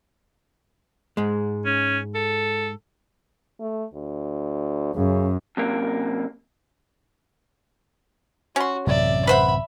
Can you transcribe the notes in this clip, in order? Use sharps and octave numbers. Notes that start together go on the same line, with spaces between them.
G#2 G#3
C#4
A4
A3
D2
F#2 C#3
F#2 C3 A#3
C#4 F#4 C6
A1 F#2 C3 D5 E5
B4 C5 E5 F#5 B5